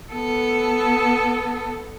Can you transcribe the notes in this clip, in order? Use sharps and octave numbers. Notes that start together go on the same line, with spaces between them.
B3 A4